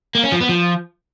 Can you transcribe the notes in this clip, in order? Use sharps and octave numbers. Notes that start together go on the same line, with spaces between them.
A#3
C#4
F3
B3
F3